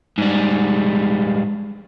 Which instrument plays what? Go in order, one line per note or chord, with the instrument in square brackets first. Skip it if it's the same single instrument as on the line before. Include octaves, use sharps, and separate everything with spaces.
[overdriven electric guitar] G#2 G3